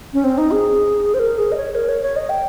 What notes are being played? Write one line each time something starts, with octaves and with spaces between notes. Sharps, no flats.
C#4
C4
D#4
G#4
C5
A#4
G#4
D#5
C#5
A#4
C#5
C#5
D#5
G5